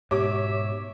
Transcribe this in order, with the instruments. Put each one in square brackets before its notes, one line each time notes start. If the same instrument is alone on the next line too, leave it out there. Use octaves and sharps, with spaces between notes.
[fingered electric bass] G#2 B2 [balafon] G4 [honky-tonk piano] C#5 D6 [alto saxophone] E5